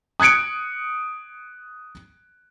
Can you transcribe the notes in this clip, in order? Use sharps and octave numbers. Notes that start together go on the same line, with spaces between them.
D#6 F#6 G#6 C#7 D7